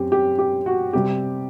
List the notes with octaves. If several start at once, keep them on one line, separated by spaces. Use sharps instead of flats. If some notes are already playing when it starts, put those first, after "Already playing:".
Already playing: F#2 C4 G4
G4
G4
F#4
C3 G3 C4 G4